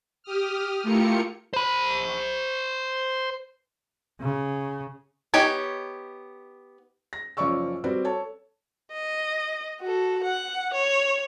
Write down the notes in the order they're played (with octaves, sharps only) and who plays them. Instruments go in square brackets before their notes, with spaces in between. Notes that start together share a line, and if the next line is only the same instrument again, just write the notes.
[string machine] G4 D#6 F6
A3 E4 F4 G4 A#4 C#7
[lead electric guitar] C5 B5
[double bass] C#3
[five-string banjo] B3 D#4 G4 C#5 G#5
[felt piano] A#6
F#1 F3 C#4 D5 C#6 E6
G3 C4 F#4 B4 D5
A4 C#5 A5
[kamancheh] D#5
F#4 A4
F#5
C#5